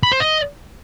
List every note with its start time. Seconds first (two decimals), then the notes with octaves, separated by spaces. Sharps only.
0.03 B5
0.12 C5
0.20 D#5